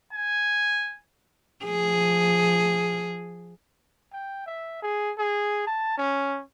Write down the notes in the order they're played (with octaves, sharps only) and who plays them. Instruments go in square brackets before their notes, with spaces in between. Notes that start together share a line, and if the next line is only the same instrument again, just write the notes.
[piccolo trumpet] G#5
[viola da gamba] F3 G#4
[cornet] G5
E5
G#4
G#4
A5
C#4